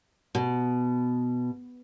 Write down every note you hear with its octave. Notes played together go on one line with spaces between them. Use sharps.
B2